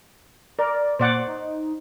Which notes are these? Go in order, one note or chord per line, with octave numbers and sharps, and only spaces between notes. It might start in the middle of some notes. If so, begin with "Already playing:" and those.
A#4 D5
A#2 C5 D5 F#5
D#4